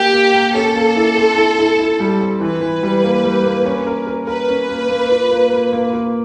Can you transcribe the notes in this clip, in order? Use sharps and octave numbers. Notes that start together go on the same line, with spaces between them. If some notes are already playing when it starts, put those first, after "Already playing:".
Already playing: A#3 G4
A#3
A#3
C#4 A4
A#3
E4
C4
E4
E4
E4
G3
C4
E3 B4
E3
G3
A#3
G3
A#3
C#4
A#4
A#4
A#4 B4
C#4
A#3
A#3
F4
A#3
A#3
A#3
A#3